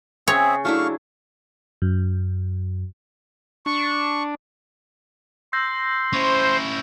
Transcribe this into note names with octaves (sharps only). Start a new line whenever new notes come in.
C#3 C4 G#4 C#5 E5
F#3 A3 D4 E4 F5 C#6
F#2
D4 C#6
C6 E6 G6 A#6
C#4 E4 C5 C#6 A#6